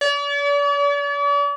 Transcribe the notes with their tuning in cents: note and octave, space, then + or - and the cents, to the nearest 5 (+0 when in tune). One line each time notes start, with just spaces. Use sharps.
D5 -45